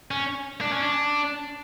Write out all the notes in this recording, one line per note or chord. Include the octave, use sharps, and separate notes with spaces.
C#4
D4
C#4
D4